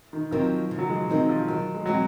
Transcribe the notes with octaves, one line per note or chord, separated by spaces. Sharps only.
D#3
F3 F#3 C4 D#4 A#4
C#3
F#3
G#3
D#3 F#3 C4 D#4 A#4
F3
D#3 F#3
G#3
F#3 G#3 C4